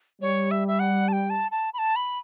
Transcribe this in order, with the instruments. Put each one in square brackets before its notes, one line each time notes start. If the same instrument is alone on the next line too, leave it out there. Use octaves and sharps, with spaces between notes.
[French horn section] G3 [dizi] C#5
[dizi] E5
E5
F#5
A5
G5
A5
A5
B5
A5
B5